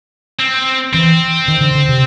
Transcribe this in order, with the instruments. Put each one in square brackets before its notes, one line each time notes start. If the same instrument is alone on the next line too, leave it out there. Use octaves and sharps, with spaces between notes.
[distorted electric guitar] C4
[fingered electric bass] E3 [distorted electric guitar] C4
[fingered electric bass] D#3
D3
D3
C3